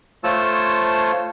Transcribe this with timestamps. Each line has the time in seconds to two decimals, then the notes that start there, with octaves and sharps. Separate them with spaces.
0.24 A3 F4 C5 C#5 A5 E6